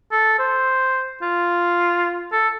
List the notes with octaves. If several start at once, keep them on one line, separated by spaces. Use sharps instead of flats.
A4
C5
F4
A4